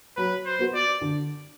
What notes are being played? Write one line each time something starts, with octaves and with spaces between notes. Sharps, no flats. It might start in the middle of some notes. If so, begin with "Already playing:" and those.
F#3 B4
C5
B3 F#4 B4
D5
D3